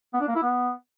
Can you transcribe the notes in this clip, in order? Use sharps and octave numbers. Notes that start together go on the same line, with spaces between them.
B3
D4
A#3
E4
B3